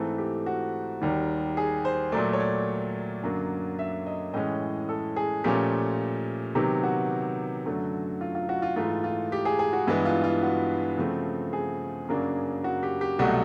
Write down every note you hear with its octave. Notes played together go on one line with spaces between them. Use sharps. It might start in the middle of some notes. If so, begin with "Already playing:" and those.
Already playing: G#2 E3 A3 C4 A4
G4
F#4
D#2 D#3 G3
G#4
C5
A#2 F#3 A3 D5
C#5
D5
F#2 D3 F#3 A#3
E5
D#5
A2 E3 G#3 C#4 D#5
A4
G#4
A#2 F3 A3 C#4 G4
C3 D#3 F#3 B3 G4
F#4
F#2 D3 F#3 A3
F4
F4
F#4
F4
G#2 E3 A3 F4
F4
G4
G#4
G#4
F#4
G2 E3 G#3 B3 E4
F4
F4
F#4
C#3 F3 A3 C4
G#4
F#2 C#3 F#3 A#3 D4
F#4
G4
G4
C2 B2 F#3 A3 F#4